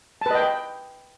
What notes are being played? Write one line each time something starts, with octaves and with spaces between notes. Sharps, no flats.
B4 D#5 G5 A5